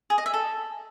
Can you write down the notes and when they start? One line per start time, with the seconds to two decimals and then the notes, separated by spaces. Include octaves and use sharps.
0.10 G#4
0.18 D#5
0.26 E5
0.34 A4